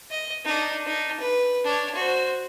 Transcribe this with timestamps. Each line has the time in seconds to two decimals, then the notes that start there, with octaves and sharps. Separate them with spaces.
0.11 D#5
0.45 D4 D#4
0.86 D4 D#4
1.20 B4
1.64 D4 C#5
1.95 F#4 C5